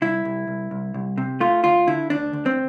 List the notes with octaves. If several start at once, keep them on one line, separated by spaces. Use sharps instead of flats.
C2 E4
C2
C2
C2
C2
C3
A3 F4
D2 F4
D3 E4
D2 D4
D2
C4